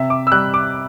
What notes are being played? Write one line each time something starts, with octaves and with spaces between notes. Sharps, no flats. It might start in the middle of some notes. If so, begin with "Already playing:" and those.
Already playing: C3 E5
D6
E6
G3 F#6
D6